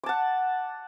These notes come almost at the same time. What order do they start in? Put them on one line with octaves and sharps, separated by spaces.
D6 A5 F#5